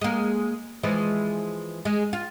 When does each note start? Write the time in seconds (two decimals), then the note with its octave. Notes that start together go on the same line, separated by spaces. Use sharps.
0.01 G#3 A#3
0.83 E3 F3 G#3
1.85 G#3
2.13 F4